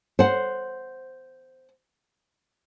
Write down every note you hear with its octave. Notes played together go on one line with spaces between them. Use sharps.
C5 F#5